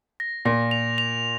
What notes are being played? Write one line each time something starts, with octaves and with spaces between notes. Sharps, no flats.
A#6
A#2 A#6
F7
F7